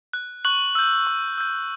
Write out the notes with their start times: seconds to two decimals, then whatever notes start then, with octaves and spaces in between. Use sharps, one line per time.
0.13 F#6
0.45 C#6 F#6 F#7
0.75 E6 G6
1.07 C#6
1.38 E6 G6